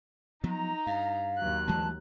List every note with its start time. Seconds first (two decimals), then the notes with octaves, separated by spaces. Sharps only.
0.44 F3 F#3 B3 D#4 A#5
0.87 G2 F5
1.36 D#2 F#3 F#6
1.68 E3 G#3 A3 A5